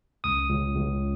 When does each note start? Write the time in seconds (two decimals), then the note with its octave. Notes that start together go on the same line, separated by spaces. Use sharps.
0.24 C#2 D#6
0.50 C#2
0.74 C#2